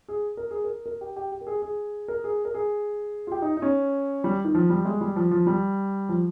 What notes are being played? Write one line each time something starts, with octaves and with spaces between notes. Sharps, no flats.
G#4
A#4
G#4
A#4
A#4
G4
G4
G4
A#4
G#4
G#4
A#4
G#4
A#4
G#4
F4
G4
D#4
D#4
C#4
G3
D#3
F3
G3
G#3
G3
F3
F3
G3
F3